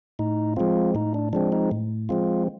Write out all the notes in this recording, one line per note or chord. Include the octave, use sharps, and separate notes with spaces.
A2 D#4
F3 G#3 C4 F4
A2 D#4
D4
F3 G#3 C4 D4
D#4
A2
F3 G#3 C4 F4